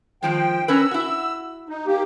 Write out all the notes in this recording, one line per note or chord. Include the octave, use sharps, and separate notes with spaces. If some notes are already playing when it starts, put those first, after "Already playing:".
D#3 F3 G#3 G5
C#4 A#4 B4 E6
E4 F#4
D#4
A#3 G4